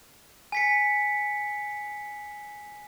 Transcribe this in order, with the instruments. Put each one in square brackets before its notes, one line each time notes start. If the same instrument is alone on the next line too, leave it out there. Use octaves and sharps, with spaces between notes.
[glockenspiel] G#5 B6 C#7